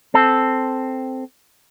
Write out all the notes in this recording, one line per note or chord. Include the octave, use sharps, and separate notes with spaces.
C4 A4